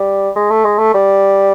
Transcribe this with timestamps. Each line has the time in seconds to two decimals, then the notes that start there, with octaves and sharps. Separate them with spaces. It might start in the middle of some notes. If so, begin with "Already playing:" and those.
Already playing: G3
0.36 G#3
0.50 A3
0.65 G#3
0.78 A3
0.94 G3